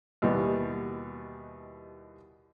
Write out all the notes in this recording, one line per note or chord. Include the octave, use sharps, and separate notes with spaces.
D#2 B2 E3 G3 B3